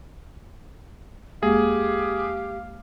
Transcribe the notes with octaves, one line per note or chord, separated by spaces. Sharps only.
D#2 G#3 A#3 G4 G#4 F5